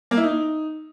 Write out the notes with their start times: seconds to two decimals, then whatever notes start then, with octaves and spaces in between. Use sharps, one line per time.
0.11 A#3
0.17 E4
0.23 D#4